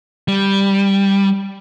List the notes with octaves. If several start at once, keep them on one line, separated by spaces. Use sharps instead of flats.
G3